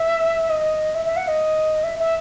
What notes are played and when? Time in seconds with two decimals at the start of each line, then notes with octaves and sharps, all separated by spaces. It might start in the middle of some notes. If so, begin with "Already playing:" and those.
Already playing: E5
0.49 D#5
0.95 E5
1.05 E5
1.16 F#5
1.28 D#5
1.83 E5
1.99 E5